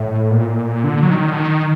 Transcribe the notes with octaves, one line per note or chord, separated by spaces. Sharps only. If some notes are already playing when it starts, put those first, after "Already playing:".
Already playing: A2
A#2
D3
F#3
D#3
D3
D#3